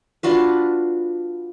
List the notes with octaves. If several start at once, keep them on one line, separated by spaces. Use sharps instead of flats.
D4 F4 F#4 B4